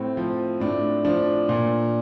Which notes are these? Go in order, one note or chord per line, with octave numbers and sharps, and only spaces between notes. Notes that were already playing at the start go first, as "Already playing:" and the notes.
Already playing: A2 C4
F3
A2 D4
F3 D4
A#2